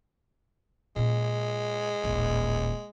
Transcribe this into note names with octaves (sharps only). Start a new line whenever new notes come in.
A#2 G#3 C#4
D#1 A1